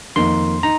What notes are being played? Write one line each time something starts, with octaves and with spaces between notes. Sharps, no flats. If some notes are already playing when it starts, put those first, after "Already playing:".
F2 D#3 A#3 D#4 C6
D#4 A#5